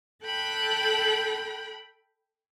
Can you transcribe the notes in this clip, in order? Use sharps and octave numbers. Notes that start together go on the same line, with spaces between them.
A4 G5 B5 F#6